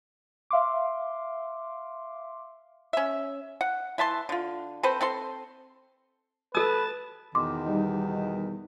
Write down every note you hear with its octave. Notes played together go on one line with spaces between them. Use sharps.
E5 F5 C6 D6
C#4 E5
F#5
E3 E5 A5 C6
D3 F4
C4 A4 B4 C5
C4 A4 C6
A4 B4 A5 E6
E2 B2 D#3 C6 D6
G3 D#4